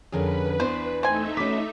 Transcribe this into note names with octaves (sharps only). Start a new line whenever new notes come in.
F2 D3 C#4 G#4 A#4 B4
E2 B3 D4 C5
A3 C4 D#4 E5 G#5
C#4 F#4 B4 D6 B6